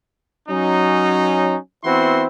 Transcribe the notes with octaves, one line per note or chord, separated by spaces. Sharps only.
F#3 C#4 D#4
E3 B3 C4 E4 F#4 C6